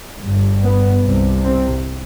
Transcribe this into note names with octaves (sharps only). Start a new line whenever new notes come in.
G1 G2
B3
C2 C3
C4